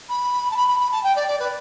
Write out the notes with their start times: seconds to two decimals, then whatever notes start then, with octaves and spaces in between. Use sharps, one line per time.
0.09 B5
0.50 A5
0.56 B5
0.68 B5
0.80 B5
0.91 A5
1.03 G5
1.15 D5
1.27 D5
1.39 B4